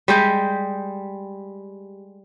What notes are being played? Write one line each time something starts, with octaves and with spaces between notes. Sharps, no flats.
G3 G#3 G4